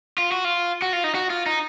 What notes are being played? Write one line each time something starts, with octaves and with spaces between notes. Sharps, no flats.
F4
F#4
F4
F#4
F4
D#4
F#4
F4
D#4